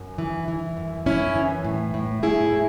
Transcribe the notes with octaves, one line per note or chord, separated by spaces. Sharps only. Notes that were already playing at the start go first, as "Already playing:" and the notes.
Already playing: F#2
E3
E3
F#2
F#2 C#4 E4
E3
A2
A2
A2 E4 G#4
A2